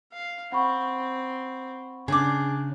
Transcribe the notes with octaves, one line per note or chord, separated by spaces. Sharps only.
F5
C4 F#5 B5 C#6
C#3 D4 G#4 D6